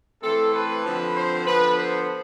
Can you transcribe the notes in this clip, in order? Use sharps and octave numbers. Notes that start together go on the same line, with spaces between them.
E3 A3 C4 A4
B4
D3 F3 C4
C5
D3 F3 B3 B4
C5